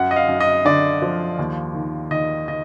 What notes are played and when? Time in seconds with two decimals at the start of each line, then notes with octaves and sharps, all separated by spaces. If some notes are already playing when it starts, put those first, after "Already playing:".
Already playing: F#2 F#5
0.11 D#5
0.16 F5
0.28 F#2
0.40 D#5
0.65 D3 D5
1.02 F3
1.38 D#2
1.74 D#3
2.11 D#3 D#5
2.48 D#3 D#5